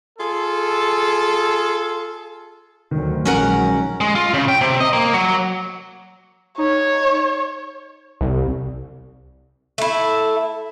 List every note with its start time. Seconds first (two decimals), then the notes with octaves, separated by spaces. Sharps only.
0.18 F4 G#4 A4
2.91 D2 D#3 F#3
3.25 A#1 F#3 G#3 C#4 A#4 F#5
4.01 G#3
4.15 F4
4.34 C#3
4.48 G5
4.61 C3
4.80 D#5
4.93 A#3
5.13 F#3
6.58 D#4 C#5
8.21 C2
9.78 A3 E4